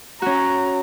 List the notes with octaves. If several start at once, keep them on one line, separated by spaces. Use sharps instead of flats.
C#4 F#4 A#5